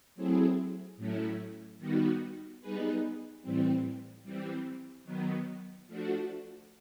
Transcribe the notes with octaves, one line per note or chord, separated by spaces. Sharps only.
F#3 A3 C4 E4 G#4
A2 F#3 A3 C#4 E4
D#3 G3 B3 D#4 F#4
G3 B3 D#4 G#4 B4
A2 E3 G3 C4
E3 G3 C4
D#3 F#3 B3
F3 A3 D4 F#4